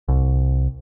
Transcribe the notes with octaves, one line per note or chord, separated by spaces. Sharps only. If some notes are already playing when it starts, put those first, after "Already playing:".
C2